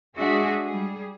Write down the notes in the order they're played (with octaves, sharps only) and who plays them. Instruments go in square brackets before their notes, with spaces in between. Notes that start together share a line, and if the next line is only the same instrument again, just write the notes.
[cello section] G#3 D4 F#4 G#4 E5
G3 G#4